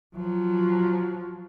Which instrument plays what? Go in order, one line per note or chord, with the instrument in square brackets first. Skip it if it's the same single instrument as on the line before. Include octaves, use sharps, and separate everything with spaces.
[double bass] F3 F#3